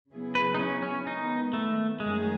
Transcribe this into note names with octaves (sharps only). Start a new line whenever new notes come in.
C#3 F#3 B3 E4 G#4
B4
D#4
C#4
C#4
D#3 G#3 B3 D#4
A3
F#2 D#3 G#3 A3 C#4 G#4